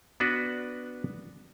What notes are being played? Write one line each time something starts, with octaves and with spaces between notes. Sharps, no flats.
B3 D4 F#4 B4